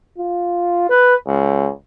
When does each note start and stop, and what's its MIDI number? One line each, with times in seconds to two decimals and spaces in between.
0.18 0.86 65
0.90 1.15 71
1.27 1.70 37